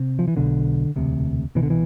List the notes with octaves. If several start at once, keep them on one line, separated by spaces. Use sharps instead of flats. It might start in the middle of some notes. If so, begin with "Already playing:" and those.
Already playing: C3
F3
E3
B1 B2 D3
E1 D2 C3
C2 B2 E3
D3
E3